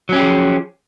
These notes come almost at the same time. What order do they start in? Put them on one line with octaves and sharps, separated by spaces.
F#3 C#4 G4 G#4 F3